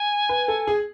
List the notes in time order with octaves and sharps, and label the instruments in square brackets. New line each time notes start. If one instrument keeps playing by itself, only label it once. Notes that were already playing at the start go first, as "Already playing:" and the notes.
Already playing: [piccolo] G#5
[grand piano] B4
A4
G#4